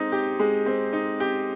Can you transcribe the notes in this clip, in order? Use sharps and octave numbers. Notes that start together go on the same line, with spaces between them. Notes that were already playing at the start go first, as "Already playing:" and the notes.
Already playing: G#3 C4 D#4
G4
G#3
C4
D#4
G4